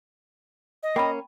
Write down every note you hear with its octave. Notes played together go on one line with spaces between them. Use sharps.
D#5
A#3 C#4 G5 B5